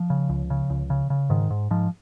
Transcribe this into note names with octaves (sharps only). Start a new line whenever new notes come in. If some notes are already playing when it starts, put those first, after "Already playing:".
Already playing: F3
C#3
C#2
C#3
C#2
C#3
C#3
G#2 D#3
G#2
G#2 F3